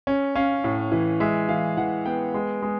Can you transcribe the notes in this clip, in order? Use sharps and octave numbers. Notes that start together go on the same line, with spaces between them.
C#4
C#4 F5
A2
E3
G#3 E5
E3 F5
E3 F#5
B3 G5
G#3
G#3